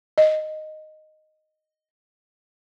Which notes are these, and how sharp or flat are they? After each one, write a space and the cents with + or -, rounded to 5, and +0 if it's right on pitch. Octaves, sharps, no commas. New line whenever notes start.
D#5 -5